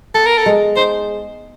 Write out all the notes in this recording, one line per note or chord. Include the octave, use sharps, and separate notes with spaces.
B3 A4
A#4
A4
G#3
D#4 C5